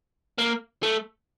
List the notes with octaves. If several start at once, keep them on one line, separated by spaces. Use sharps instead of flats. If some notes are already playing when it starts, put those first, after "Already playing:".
A#3
A3